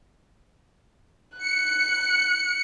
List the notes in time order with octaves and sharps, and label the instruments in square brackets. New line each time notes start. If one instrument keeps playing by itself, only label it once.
[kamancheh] F#6 [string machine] C#7